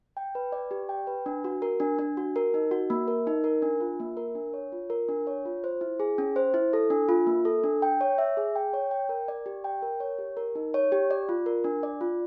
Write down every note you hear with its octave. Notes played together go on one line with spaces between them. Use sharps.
G5
B4
D5
G4
G5
B4
D4
F#4
A#4
D4
D4
F#4
A#4
D#4
F#4
A#3
A#4
D#4
A#4
D4
F4
A#3
A#4
D4
C#5
F4
A#4
D4
C#5
F4
C5
E4
G#4
C#4
C5
E4
A4
D4
F4
A#3
A4
D4
G5
C#5
E5
G#4
G5
C#5
G5
A#4
D5
G4
G5
A#4
C#5
G4
A#4
D#4
C#5
G4
D5
F4
A#4
D4
D5
F4